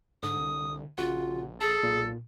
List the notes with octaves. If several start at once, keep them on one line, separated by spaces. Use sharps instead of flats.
G#2 D3 D#6
C2
A#1 C#3 F4 F#4 F#5
G#4 A4 A5 A6
B1 A#2